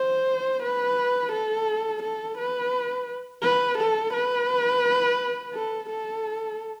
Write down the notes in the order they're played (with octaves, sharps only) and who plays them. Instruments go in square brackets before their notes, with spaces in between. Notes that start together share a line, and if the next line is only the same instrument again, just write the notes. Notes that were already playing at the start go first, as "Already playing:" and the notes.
Already playing: [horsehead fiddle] C5
B4
A4
A4
B4
B4
A4
B4
A4
A4